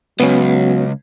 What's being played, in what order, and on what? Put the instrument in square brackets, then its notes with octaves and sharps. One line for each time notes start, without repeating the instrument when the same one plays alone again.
[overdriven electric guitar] C#2 [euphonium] F#3 [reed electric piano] B3 C#4